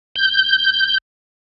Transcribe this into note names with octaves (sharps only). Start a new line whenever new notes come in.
G6